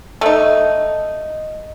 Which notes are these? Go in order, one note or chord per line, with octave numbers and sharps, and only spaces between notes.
A3 D#4